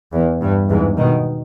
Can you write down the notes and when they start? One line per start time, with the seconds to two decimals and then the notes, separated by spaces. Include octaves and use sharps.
0.12 E2
0.41 G2
0.69 E2 G#2
0.97 B2 D#3